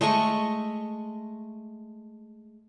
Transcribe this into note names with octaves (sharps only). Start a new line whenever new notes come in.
G#3 A3 D#5 C#6